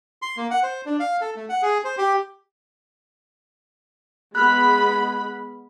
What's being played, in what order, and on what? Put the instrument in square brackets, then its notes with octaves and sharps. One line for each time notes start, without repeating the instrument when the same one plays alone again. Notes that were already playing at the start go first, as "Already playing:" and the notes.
[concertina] C6
A#3
F#5
C5
D4
F5
A4
A3
F#5
G#4
C5
G4
[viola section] G#3 B3 B5 [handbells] F6 F#6